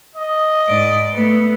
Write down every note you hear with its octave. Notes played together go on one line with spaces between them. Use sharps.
D#5
G#2 D5
A3 B3